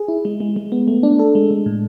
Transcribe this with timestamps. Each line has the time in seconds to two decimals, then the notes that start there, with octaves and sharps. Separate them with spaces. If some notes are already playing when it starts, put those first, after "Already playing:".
Already playing: G#4
0.08 E4
0.25 G#3
0.40 G#3
0.56 G#3
0.72 B3
0.88 A3
1.03 D4
1.19 A4
1.35 G#3
1.51 G#3
1.66 A2